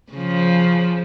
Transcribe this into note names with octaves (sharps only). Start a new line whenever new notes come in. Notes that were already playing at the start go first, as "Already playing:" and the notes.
C#3 F3